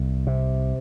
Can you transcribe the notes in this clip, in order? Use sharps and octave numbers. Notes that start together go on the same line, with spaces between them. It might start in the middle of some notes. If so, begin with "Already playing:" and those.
Already playing: C2
C3